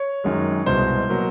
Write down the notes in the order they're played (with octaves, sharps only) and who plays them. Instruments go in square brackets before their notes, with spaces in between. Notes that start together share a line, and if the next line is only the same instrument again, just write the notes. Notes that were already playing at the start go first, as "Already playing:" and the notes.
Already playing: [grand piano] C#5
F#2 D#3 G#3
C2 B2 G#3 C5
B2 F#3 A#3